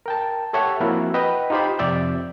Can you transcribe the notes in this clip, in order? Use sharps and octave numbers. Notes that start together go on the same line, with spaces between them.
A#4 G5 A5
G4 A4 C#5 E5 F#5 A5
F3 A#3 C4 E4 F#4
B4 D#5 F#5 G5
D#4 F4 G4 C5 B5
F2 C3 D5 E5 G6